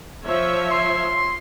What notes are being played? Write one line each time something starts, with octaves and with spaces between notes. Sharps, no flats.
F3 C#5 E5
C6